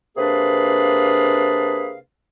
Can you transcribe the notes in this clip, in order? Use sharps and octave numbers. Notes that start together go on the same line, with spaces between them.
C3 A#3 D4 G#4 B4 F5